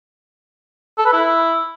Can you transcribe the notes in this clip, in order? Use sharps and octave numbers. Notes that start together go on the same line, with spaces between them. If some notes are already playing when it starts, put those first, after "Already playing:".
A4
B4
E4